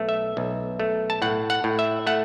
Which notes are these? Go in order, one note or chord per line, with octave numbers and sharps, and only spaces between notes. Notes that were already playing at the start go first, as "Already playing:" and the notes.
Already playing: B1 A3
E5
B1
A3
A5
A2 F#5
F#5
A2
E5
A3 F#5